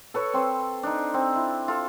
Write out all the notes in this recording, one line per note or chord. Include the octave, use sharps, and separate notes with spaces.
A4 B4 C#5
C4 C6
D4 D#4
C4
E4
F4 A4